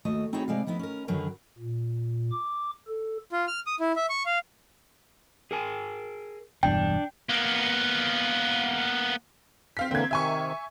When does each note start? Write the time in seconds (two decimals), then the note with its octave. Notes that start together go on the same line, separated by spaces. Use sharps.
0.05 D#2 A3 F#4 D#5
0.33 C4 D#4 E4 F#4 G#4 C#5
0.48 C3 G#3 D5 F5
0.67 F3 B3 D#4 E4
0.79 C#4 A#4
1.08 F#2 D3 D#3 F#3 A#4 B4
1.58 A#2
2.31 D6
2.88 A4
3.32 F4
3.48 F6
3.67 D#6
3.80 E4
3.96 E5
4.10 C#6
4.26 F5
5.51 G#4 A#4 G#5
6.63 E1 E2 G2 D4 G5
7.29 A#3 B3
9.77 C4 F5 B6
9.91 D3 E3 A#3 C4 G#6
10.11 C3 D#3 E5 G#5 C#6